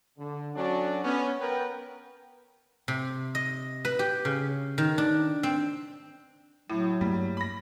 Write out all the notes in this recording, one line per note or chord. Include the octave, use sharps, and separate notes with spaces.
D3
F#3 C#4 D4 F#4 A4 D5
B3 C#4
B3 A#4 B4 G5
C3
D#5
B4
G4
C#3
D#3
D4
C4
A2 F#3 E4
G2 G3 A3 A#3
B5 A#6